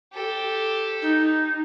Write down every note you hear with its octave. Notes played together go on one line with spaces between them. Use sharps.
G4 A4
D#4